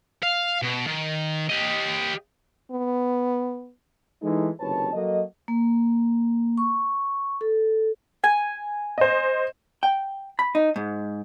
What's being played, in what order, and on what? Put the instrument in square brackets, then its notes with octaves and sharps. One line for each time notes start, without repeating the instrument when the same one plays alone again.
[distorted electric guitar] F5
B2
D#3
G4 D#5
[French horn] B3
[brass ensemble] E3 G#3 A3 D#4
F#1 C3 D#3 B4 C#5 A5
F#3 A#3 F#4 A4 D#5
[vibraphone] A#3
C#6
A4
[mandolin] G#5
[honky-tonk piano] C5 D#5
[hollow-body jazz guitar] G5
B5
D#4
G#2